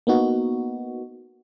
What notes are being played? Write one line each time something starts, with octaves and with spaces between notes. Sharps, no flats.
A#3 B3 D#4 F#4